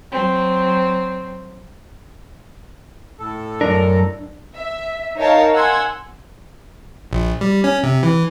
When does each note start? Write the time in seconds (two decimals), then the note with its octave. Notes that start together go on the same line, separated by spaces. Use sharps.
0.11 F#3 C4
3.19 A2 A4
3.61 F#2 D4 A#4
4.57 E5
5.17 D#4 A#4 C#5 F5 A5
5.54 F#5 G#5 C6 E6 G#6
7.11 A#1
7.41 G3
7.64 C#4
7.83 C3
8.03 E3